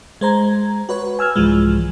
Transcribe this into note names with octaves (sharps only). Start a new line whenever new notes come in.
G#3 C5 A#5 G#6
F#4 B4 C#5
G#5 E6 F6 G#6
C2 G#2 E3 F3 G#3